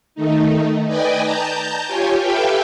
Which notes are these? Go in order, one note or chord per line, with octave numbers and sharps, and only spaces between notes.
D#3 A3 D#4
B4 D5 D#5 G5 G#5
A5 A#5 G6
F4 G4 C#5 G#5
G4 A4 B4 E5 F5 G5